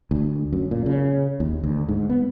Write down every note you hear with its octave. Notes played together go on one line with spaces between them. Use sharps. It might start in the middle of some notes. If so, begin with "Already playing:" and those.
D2
F#2
A#2
C#3
D#2
D2
G#2
B3